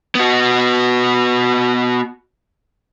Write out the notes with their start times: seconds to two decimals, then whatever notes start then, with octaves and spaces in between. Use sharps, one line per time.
0.15 B3 F#4